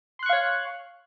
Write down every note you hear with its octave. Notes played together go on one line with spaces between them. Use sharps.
C#5 F5 C6 C#6 F#6